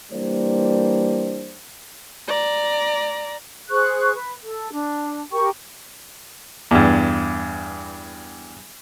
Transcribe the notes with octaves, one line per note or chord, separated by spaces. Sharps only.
E3 G3 A#3 D4 C5 D5
D5 A#5
G#4 C5 C#6 F#6
B4
A4
D4
G4 A#4 G5 C#6
E2 G2